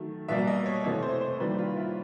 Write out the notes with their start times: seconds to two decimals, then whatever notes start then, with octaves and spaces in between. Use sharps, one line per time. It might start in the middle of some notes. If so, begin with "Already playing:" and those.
Already playing: D#3 F#3 A3
0.28 B2 G3 A#3 E5
0.47 D#5
0.66 C#5
0.84 C3 E3 A3 C#5
1.03 C5
1.21 C5
1.40 D#3 G3 A#3 B4
1.59 F4
1.76 E4